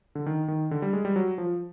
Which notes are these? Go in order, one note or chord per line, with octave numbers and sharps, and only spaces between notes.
D3
D#3
D#3
D3
G3
G#3
G3
F#3
F3